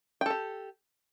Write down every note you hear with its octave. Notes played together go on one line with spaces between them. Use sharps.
G4 A4 G5